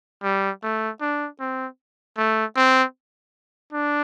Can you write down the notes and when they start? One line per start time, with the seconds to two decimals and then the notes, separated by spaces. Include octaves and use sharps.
0.23 G3
0.63 A3
1.01 D4
1.40 C4
2.18 A3
2.56 C4
3.73 D4